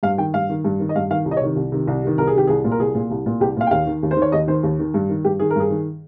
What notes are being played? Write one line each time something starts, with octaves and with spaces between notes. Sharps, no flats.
G2 F5
D#3 G5
G2 F5
D#3
G2
D#3
D#5
G2 F5
D#3 F5
C2
D#5
C#5
C3 D#3
C2
C3 D#3
C2
C3 D#3
C2 A#4
G#4
C3 D#3 G4
C2 G#4
A#2
A#4
C2 G#4
A#2
C2
A#2
C2 G4
A#2 F5
G5
D#2 F5
D#3
D#2
C5
D#3
C#5
D#2 D#5
D#3 C5
D#2
D#3
G2
D#3
G2 G4
D#3 G#4
A#4
G2 G#4
D#3